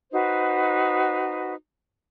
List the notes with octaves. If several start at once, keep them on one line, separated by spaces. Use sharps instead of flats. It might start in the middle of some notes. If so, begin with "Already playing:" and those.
D#4 F#4 B4 C5